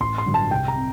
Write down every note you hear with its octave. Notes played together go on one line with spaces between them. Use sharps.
A1 C6
C6
G2 D3 F#3
A5
C2 G5
A#5
C3